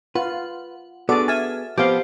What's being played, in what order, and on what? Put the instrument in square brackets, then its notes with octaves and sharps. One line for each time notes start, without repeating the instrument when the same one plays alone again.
[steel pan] F4 [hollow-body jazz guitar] B4 [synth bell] F#5
[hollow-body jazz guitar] B3 D4 G#4 [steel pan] F#4 A4 D5 [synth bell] D6
[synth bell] E5 F6 A6 [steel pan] G#5
[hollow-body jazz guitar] F3 B3 C4 [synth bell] G4 C5 [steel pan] F5 D6